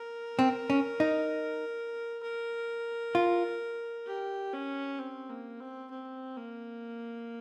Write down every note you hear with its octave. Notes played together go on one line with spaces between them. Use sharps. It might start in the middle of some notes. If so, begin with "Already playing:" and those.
Already playing: A#4
C4
C#4
D#4
A#4
F4
G4
C#4
C4
A#3
C4
C4
A#3